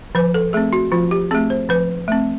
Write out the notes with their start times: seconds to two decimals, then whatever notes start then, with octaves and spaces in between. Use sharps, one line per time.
0.15 F3 B4
0.34 A4
0.53 A3 C4 G#4
0.73 F#4
0.92 F3 F4
1.11 G4
1.31 A3 C4 G#4
1.50 C5
1.69 F3 B4
2.08 A3 C4